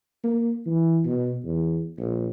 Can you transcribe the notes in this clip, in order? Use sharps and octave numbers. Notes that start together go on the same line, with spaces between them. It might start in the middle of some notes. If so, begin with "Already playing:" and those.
A#3
E3
B2
E2
A#1